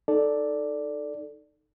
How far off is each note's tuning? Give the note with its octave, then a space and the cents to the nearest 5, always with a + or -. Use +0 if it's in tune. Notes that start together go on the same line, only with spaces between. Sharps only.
D#4 -10 A4 +0 D5 +0